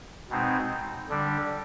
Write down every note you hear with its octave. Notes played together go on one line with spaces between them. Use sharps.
B2 G#3 C4 D#4
D3 G3 D4